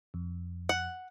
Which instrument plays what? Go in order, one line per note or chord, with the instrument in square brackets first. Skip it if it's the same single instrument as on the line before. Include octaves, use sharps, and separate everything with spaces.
[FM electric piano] F2
[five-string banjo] F#5